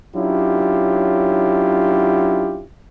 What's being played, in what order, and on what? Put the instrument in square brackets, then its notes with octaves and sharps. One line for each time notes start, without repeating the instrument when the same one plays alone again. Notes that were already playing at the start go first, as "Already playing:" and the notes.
[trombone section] F#3 C#4 D4 E4 F4 G4